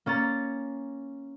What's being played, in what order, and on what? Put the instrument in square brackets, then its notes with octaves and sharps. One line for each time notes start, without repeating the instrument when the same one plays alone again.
[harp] A#3 C#4 A#5 A6